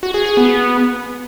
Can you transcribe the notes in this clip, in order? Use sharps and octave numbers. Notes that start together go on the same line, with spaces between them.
F#4
G#4
G#4
B3